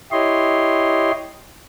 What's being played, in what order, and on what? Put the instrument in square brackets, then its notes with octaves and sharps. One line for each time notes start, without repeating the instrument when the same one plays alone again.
[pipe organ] E4 G4 C#5 D#5 C6